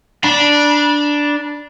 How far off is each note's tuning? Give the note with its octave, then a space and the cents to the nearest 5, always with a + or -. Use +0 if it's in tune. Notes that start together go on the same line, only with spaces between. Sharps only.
D4 +0 B5 -35